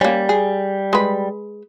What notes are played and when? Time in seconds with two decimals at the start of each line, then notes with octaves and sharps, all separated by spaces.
0.01 G3 A#3 C#4
0.29 G#4
0.93 G#3 B4